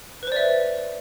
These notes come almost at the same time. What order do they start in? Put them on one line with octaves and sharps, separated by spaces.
B4 C5 D5 E5